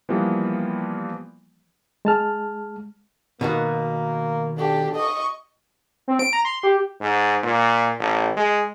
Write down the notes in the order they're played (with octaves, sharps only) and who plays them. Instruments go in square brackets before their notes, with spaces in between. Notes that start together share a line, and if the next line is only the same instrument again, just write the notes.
[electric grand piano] E3 F3 G3 A#3 B3
[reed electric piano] G#3 A5 F6
[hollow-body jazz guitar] B2 D#3 F#4 [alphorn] A#3
[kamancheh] D4 G4 [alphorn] A4
[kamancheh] D#5 C#6
[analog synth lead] C4
D7
A#5
C6
G4
[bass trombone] G#2
A#2
A1
G#3